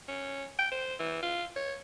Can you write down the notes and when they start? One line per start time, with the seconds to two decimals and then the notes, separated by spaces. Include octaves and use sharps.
0.08 C#4
0.59 G5
0.72 C5
0.99 E3
1.23 F4
1.56 C#5